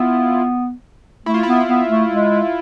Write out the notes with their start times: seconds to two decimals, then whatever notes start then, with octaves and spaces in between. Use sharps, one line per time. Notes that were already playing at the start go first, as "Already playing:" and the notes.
Already playing: B3 E4 F4
1.26 A3 E4
1.34 F4
1.43 B3 E4
1.68 B3
1.90 A3
2.11 G#3